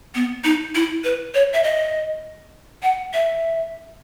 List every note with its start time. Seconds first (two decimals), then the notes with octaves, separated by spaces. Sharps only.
0.15 B3
0.44 D#4
0.75 E4
1.04 B4
1.34 C#5
1.53 E5
1.64 D#5
2.83 F#5
3.13 E5